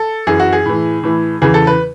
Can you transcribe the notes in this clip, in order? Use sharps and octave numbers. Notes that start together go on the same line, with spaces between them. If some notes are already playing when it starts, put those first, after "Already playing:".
Already playing: A4
F#2 E3 G#4
F#4
G#4
A2 E3
A2 E3
E2 C#3 E3 G#4
A4
B4